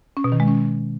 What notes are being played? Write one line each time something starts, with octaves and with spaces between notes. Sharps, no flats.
C#4
B2
D#3
G#3
C#4